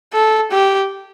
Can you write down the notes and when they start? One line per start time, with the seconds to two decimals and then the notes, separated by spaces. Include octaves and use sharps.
0.14 A4
0.51 G4